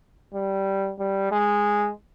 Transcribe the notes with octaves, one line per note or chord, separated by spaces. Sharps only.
G3
G3
G#3